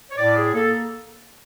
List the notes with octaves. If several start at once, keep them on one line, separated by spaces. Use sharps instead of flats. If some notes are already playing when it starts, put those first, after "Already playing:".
C#5
A2 D5
G#4
A#3 A4